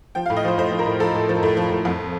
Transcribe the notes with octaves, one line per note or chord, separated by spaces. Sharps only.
F3 G5
F5
A2
D#5
F3 C5
A2 C5
F3
A#4
A2
F3 A4
A2
F3
A2
F3
A2
F2